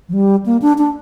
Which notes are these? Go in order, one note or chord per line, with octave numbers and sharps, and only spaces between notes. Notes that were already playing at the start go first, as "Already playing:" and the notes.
F3
G3
A#3
D4
D4